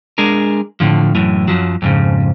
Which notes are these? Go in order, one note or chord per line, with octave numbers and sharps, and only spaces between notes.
G#3 D4 G#4 A#4
A2 D3 F3
F#2 A2 E3
F#2 F3 F#3
F2 G#2 C#3